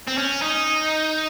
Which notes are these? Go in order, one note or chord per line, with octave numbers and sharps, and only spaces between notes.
C4
C#4
D#4